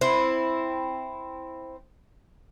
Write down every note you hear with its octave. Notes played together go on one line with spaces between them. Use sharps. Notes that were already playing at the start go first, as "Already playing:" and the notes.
C4 E4